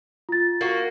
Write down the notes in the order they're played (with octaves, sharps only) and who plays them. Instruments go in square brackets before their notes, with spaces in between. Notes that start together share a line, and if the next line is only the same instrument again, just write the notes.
[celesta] F4 A6
[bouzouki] A#3 F#4